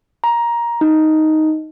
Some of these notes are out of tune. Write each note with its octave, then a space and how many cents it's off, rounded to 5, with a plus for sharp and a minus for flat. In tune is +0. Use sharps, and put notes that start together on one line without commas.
A#5 +15
D#4 +5